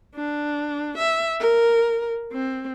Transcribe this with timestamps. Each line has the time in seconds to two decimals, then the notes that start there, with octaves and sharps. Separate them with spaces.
0.15 D4
0.98 E5
1.40 A#4
2.32 C4